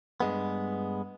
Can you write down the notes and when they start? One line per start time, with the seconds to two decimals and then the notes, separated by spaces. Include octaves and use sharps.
0.20 G2 G#3 B3